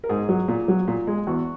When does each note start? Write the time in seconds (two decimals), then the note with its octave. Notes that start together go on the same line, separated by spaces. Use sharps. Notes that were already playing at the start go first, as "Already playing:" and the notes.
0.04 A#4
0.09 G#2 G#4
0.29 F#3
0.48 A#2
0.68 F#3
0.88 A#2
1.07 G#3
1.27 E2 F#4